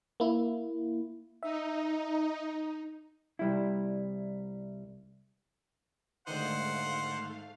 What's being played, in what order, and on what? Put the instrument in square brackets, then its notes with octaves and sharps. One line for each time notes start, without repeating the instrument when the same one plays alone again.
[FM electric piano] A#3 E4
[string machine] D#4 [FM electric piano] E5
[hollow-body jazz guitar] C2 G3 E4
[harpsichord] D2 D#3 [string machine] G#2 A3 F5 [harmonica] C5 F#5